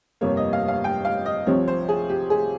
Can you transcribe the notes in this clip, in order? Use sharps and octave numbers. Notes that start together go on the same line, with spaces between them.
G1 F2 C3 G3 A#3 C#5
D#5
F5
F5
G5
F5
D#5
C2 C3 F3 C4 C#5
C5
G#4
G4
G#4